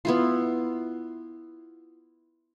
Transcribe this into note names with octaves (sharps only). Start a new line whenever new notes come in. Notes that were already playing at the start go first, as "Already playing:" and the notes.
B3 E4 F4